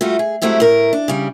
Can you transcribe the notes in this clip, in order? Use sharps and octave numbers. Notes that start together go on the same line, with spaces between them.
G3 A3 F4 F#4
G#4
F#3 G#3 A3 C4 E4 G4
A2 A#4
D4
C#3 G3